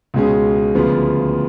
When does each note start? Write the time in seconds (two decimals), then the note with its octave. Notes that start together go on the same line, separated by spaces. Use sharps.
0.14 C#2 B2 G#3 C#4 G#4
0.75 D2 C#3 F3 B3 F4